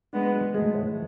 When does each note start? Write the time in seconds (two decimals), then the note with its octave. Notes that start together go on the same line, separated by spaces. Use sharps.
0.13 G#3 B3 D4
0.34 F#4
0.54 G#3 A3
0.74 A2